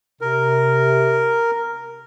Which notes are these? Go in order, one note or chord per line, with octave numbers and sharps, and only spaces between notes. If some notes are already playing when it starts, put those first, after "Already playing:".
C3 A#4